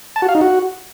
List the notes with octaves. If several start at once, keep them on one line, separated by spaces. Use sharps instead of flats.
A5
F#4
F5
D#4
F#4